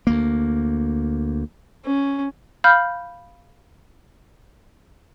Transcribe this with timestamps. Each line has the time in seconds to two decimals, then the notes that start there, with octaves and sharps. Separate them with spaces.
0.07 D2 A#3
1.85 C#4
2.64 F5 B5 F6 G6